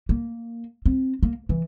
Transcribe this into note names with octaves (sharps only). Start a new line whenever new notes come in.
A#3
C4
A#3
E3